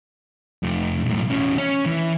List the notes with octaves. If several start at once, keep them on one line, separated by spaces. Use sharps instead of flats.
F2 A3
B1 A2
E2 C#4
C#4
E3